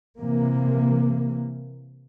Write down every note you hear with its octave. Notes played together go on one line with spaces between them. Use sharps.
C3 E3 A#3